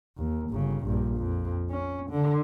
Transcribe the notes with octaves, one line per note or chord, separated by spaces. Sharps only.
D#2
G1 C#3
A#1 G2
F2
C#4
D3